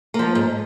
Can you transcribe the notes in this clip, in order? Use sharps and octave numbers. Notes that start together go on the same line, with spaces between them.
F3 A#3
G#2